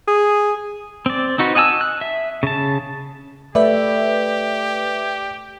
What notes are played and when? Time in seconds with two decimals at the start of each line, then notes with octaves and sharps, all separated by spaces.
0.08 G#4
1.06 C4 D5
1.38 C4 D#4 F#4 B4
1.55 D#5 F#5 G#5 A5 E6
1.81 F#6
2.01 E5
2.43 C#3 A5
3.55 A3 G4 B4 D5 E5